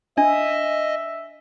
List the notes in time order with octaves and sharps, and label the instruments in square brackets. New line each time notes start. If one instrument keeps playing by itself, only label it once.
[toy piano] D4 [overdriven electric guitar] D#5 [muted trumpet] E5